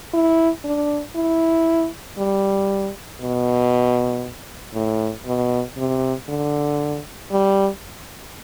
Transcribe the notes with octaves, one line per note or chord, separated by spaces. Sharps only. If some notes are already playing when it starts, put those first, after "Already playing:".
E4
D4
E4
G3
B2
A2
B2
C3
D3
G3